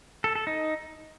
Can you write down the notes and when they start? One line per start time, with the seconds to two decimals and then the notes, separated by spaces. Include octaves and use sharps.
0.24 A4
0.35 A4
0.47 D#4